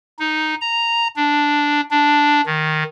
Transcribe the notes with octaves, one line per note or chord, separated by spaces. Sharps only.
D#4
A#5
D4
D4
D#3